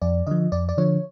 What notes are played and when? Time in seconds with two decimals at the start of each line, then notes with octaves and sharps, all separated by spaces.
0.02 F2 D5
0.27 D3 F3 D#5
0.52 F2 D5
0.69 D5
0.77 D3 F3 C#5